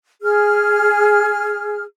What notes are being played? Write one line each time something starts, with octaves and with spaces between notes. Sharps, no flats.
G#4 F6